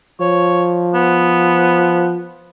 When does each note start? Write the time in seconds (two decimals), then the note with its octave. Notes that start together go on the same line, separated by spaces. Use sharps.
0.20 F3 C#5
0.95 B3